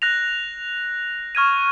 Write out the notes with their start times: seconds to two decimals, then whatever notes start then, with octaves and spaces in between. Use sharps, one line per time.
0.02 F#6 A#6 F7
1.35 C#6 F6 G#6 D#7